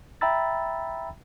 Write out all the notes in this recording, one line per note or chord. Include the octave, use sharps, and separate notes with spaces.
E5 G5 A#5 B5 E6 A6